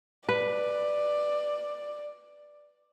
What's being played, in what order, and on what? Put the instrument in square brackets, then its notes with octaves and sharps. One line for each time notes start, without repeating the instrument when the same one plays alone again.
[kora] B4 [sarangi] D5